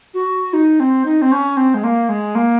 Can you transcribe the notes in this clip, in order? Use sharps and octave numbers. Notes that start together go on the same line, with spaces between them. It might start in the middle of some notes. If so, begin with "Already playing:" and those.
F#4
D#4
C4
D#4
C4
C#4
C4
G#3
A#3
G#3
A#3